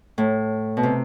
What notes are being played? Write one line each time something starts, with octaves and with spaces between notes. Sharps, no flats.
A2
B2
C3